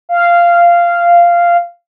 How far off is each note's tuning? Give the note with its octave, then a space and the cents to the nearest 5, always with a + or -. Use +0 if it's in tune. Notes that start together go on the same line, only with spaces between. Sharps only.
F5 -10